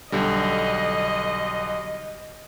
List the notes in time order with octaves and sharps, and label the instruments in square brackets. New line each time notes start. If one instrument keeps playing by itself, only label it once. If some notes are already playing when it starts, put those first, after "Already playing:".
[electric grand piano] B1 D3 G3 [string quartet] D#5